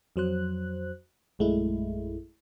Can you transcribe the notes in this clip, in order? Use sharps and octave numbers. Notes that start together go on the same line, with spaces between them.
F2 F#3 C5 F#6
A#1 F#2 G#3 A3 E4